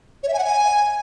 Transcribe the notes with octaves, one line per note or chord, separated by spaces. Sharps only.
C#5
E5
G#5
F#5
G#5